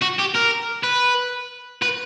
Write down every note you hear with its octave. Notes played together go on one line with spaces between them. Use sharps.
F#4
G4
A#4
B4
B4